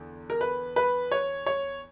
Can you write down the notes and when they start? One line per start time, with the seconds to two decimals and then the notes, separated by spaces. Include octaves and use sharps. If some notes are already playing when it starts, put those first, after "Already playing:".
Already playing: E2 D3
0.30 A#4
0.41 B4
0.76 B4
1.12 C#5
1.46 C#5